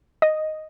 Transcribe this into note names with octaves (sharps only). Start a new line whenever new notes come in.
D#5